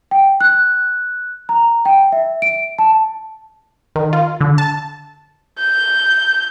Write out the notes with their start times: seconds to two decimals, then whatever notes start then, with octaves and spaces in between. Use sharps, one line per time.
0.11 G5
0.41 F#6
1.49 A#5
1.85 G5
2.12 E5
2.42 D7
2.78 A5
3.96 D#3
4.13 F4
4.41 D3
4.58 A5
5.58 G6